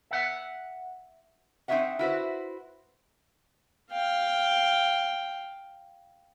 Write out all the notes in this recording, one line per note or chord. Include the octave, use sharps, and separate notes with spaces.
E5 F#5
C4 D#4 E4 F#4 E5 F#5
E4 F#4 B4 C5
F5 G5